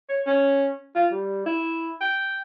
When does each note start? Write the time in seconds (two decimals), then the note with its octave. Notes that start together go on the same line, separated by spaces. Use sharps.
0.09 C#5
0.27 C#4
0.96 F4
1.12 G3
1.46 E4
2.01 G5